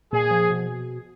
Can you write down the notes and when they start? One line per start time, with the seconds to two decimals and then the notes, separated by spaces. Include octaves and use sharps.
0.12 A#2 G#4
0.30 F3
0.50 B2